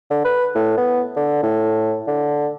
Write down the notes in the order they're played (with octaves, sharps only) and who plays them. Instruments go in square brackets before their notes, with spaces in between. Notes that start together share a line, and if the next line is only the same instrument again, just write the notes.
[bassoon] D3
B4
A2
B3
D3
A2
D3